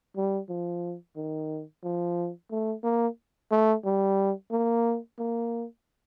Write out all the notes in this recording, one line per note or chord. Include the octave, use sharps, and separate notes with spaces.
G3
F3
D#3
F3
A3
A#3
A3
G3
A#3
A#3